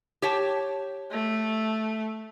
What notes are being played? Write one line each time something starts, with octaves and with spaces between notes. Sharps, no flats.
G4 C#5 A5
A3